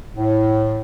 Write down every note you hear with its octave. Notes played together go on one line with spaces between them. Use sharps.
A2